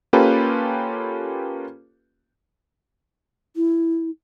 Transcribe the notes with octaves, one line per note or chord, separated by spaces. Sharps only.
A#3 C#4 F4 G4 A4 B4
E4